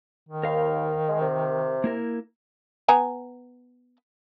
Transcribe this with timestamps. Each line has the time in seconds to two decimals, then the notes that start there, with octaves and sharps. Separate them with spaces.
0.29 D#3
0.43 D#2 A#4 C5 F5
1.08 G#3
1.21 C3
1.84 A#3 E4 A#4
2.88 B3 G#5 A#5